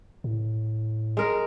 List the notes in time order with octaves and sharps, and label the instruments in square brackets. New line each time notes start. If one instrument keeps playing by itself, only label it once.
[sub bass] A2
[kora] G#3 A#4